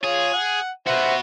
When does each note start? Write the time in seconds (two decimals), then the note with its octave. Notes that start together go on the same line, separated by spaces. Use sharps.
0.04 F4 G#4 C#5
0.33 F#5
0.87 F#4 B4 C5 E5 F#5